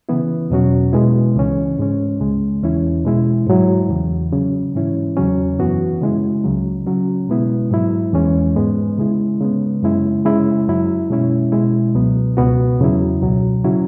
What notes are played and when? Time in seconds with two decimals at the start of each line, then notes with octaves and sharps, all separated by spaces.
0.09 C#3 E3 B3 E4
0.50 E2 B2 F#3 C#4 F#4
0.93 B2 G#3 B3 E4
1.36 C#2 C#3 E3 C#4
1.78 G#2 G#3 C#4
2.20 C#2 C#3 G#3
2.62 E2 E3 C#4 E4
3.05 B2 G#3 E4
3.47 G#2 F#3 E4
3.89 E2 C#3 E3
4.32 C#3 F#3 C#4
4.74 G#2 E3 C#4 E4
5.17 E2 C#3 F#3 C#4
5.59 F#2 E3 B3 F#4
6.02 C#3 G#3 E4
6.44 C#2 C#3 F#3
6.87 C#3 F#3 C#4
7.29 B2 G#3 B3 E4
7.71 G#2 F#3 E4
8.13 E2 E3 G#3 C#4
8.56 G#2 G#3 B3
8.98 C#3 G#3 E4
9.40 C#3 G#3 B3
9.83 F#2 C#3 G#3 E4
10.25 C#3 G#3 E4
10.68 F#2 F#3 E4
11.10 B2 G#3 C#4 E4
11.52 B2 G#3 E4
11.95 C#2 B2 F#3 B3
12.37 C#2 B2 B3 F#4
12.80 E2 C#3 F#3 E4
13.22 C#2 B2 F#3
13.64 C#3 F#3 C#4 E4